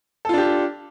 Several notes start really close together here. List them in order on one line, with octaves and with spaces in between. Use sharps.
A4 F4 D4 G4